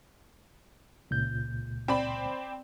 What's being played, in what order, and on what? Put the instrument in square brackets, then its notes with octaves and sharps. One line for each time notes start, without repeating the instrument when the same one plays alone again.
[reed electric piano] C#2 A#2 G6
[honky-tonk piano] C4 D5 B5